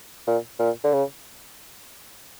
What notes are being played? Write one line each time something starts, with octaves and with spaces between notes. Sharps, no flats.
A#2
A#2
D3
C#3